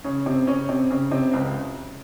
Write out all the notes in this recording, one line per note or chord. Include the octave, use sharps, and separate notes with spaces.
C#3 C#4
C3 C4
C#3 C#4
C3 C4
C#3 C#4
C3 C4
C#2 C#3